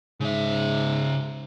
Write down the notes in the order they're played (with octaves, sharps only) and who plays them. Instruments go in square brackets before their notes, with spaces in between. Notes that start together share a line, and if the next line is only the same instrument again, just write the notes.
[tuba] G#2 [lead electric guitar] C#3 E5